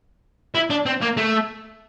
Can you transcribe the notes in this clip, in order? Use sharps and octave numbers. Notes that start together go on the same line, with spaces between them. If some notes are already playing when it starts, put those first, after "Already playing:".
E4
D4
C4
A#3
A3